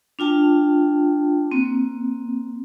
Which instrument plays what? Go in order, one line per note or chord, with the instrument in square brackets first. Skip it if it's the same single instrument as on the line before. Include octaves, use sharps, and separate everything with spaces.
[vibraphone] D4 F4 G5 A5
A#3 C4